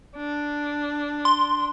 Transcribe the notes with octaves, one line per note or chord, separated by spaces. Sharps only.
D4
C6